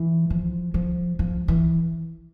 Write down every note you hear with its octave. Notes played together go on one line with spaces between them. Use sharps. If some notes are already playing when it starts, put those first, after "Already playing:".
Already playing: E3
F3
F3
F3
E3